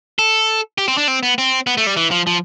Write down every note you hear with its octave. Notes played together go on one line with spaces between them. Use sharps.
A4
G4
C4
D4
C4
B3
C4
B3
A3
G3
E3
F3
F3